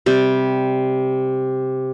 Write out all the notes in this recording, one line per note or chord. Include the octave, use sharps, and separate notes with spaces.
C3 G3